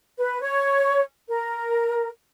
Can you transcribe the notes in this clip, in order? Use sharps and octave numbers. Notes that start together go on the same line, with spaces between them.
B4
C#5
A#4